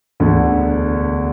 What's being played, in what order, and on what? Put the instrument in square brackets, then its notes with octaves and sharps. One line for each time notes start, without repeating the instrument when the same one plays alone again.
[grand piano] E1 D2 D3